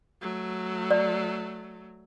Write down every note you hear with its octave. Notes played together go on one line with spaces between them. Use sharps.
F#3 A3
D5